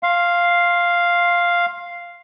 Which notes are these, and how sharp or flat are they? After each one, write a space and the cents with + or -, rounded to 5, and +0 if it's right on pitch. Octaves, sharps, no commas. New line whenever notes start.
F5 +0 C6 +25